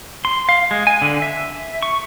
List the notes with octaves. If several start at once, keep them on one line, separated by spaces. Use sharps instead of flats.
C6
F5
G#3
G#5
D3
E5
C#6